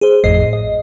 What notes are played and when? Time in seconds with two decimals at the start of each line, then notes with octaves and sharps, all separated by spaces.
0.01 G#4 C5
0.24 G#1 F2 A2 G#4 D#5 C7
0.53 D#5